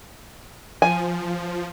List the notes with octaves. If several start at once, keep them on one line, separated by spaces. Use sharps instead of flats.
F3 G#5